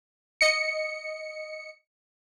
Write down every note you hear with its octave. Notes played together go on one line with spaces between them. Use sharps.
D#5 C#7